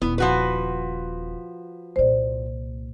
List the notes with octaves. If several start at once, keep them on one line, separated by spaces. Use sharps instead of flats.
D#1 B3 E4
F3 F#4 B4
C2 A#2 C5 D5